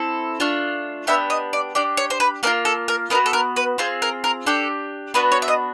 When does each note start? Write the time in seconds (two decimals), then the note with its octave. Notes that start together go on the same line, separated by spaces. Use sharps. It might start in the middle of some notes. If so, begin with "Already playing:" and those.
Already playing: C4 E4 A4
0.40 A3 D4 F4
1.07 B3 D4 G4 E5
1.30 D#5
1.53 D5
1.75 D4 G4 D5
1.97 C#5
2.10 C5
2.20 B4
2.43 A#3 D4 F4 A#4
2.65 A4
2.88 A#4
3.10 B3 D#4 F#4 A#4
3.26 A4
3.33 A#4
3.56 B4
3.78 C4 F4 G#4 C5
4.02 A#4
4.24 A#4
4.46 D4 G4 A4
5.14 B3 D4 F#4 B4
5.32 C#5
5.42 E5
5.48 D#5